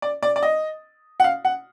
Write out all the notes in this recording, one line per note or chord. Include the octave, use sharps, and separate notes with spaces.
D5
D5
D5
D#5
F#5
F5
F#5